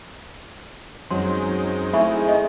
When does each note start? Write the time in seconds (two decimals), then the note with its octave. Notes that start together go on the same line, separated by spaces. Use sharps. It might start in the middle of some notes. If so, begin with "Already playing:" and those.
1.11 F#2 D#3 F#3 G#3 C4 C6
1.93 A3 E4 G#4 E5 B5 C#6
2.28 D#5